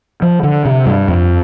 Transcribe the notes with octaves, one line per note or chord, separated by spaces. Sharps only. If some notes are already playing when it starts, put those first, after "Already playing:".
F3
D3
C3
G2
F2